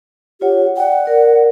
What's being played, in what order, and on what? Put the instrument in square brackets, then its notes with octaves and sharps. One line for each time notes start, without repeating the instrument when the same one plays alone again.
[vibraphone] F4 C#5 F#5 [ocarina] G4
[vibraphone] D5 G5 [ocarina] F#5
[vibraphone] A#4 D5